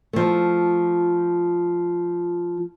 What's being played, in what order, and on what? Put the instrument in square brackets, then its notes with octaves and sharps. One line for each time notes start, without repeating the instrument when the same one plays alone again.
[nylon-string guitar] F3 A3